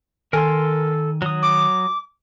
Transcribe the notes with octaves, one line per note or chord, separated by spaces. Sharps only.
D#3 A4 A#4 G#5 C6
F#3 D#6
D6